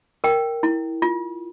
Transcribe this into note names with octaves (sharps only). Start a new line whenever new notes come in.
A#4 G5
E4
F4